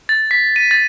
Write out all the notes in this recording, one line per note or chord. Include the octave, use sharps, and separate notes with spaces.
A6
B6
D#7
A6